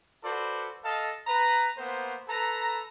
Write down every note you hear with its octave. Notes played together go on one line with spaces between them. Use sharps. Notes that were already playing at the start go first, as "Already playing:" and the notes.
F#4 A4 B4 C5 D5
A4 D#5 F5 A5
B4 A#5
A#3 B3 C5
A4 B4 A#5